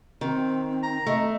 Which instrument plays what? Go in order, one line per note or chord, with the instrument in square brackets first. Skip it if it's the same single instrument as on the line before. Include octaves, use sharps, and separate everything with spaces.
[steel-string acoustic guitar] D#3 [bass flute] C4
[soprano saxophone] A#5
[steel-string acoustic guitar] A3 [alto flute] D#5